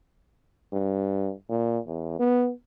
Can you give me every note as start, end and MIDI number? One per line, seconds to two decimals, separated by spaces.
0.72 1.32 43
1.49 1.79 46
1.87 2.16 40
2.19 2.51 59